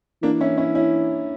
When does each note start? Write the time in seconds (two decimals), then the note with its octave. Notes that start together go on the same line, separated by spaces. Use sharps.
0.22 E3 A#3 D4
0.41 C#4 E4
0.58 C#4 E4
0.75 C#4 E4